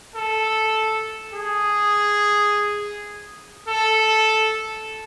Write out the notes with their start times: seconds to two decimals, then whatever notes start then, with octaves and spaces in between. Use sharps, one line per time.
0.15 A4
1.33 G#4
3.68 A4